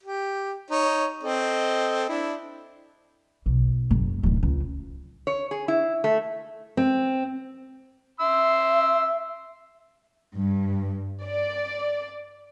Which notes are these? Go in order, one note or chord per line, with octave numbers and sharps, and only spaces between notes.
G4
D#4 C#5
C4 A4 D#5
D4 E4
B1
F#1
D1 D#3
C#2
C#5
G#4
E4
A3
C4
E5 C6 E6
G2
D5